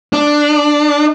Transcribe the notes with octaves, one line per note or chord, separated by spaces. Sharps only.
D4